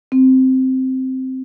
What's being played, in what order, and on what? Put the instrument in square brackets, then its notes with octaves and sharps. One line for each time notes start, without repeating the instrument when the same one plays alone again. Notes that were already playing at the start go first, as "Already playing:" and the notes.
[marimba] C4